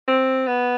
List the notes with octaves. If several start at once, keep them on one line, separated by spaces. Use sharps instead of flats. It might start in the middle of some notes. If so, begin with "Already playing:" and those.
C4
B3